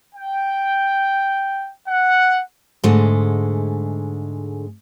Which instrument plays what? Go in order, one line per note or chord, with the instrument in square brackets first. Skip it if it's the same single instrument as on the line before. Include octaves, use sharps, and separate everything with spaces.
[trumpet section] G5
F#5
[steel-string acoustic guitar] G#2 D3 G#3 A3